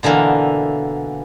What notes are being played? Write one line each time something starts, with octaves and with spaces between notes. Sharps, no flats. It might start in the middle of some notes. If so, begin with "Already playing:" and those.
B2 D3 E3 A#3